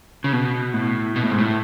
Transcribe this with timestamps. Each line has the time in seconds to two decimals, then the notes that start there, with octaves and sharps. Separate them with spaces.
0.24 C#3
0.33 B2
0.74 A2
1.16 B2
1.23 A2
1.30 G#2
1.39 A2